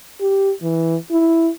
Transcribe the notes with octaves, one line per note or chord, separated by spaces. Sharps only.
G4
E3
E4